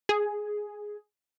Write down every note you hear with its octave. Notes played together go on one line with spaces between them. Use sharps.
G#4